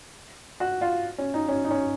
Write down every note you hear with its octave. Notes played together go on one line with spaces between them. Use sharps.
F#4
F4
C#4
D#4
C#4
D#4
C#4